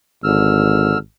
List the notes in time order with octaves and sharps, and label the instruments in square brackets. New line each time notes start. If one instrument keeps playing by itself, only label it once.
[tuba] G#1 [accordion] D3 E6 F6